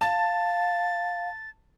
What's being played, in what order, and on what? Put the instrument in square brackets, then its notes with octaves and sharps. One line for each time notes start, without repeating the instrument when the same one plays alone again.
[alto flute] F5 [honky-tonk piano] A5 [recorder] A6